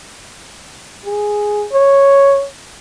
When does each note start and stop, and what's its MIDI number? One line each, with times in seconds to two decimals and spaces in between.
1.06 1.66 68
1.73 2.46 73